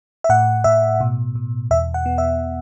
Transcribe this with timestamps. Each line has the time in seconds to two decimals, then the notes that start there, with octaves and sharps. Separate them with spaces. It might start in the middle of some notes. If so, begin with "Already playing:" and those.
0.24 E5
0.29 A2 F#5
0.64 A2 E5
1.01 B2
1.35 B2
1.71 E2 E5
1.94 F#5
2.06 B3
2.18 E5